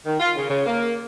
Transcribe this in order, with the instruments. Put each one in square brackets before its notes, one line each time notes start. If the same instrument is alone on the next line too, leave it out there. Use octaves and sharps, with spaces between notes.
[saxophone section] D#3
F4
C#3
C#3
A#3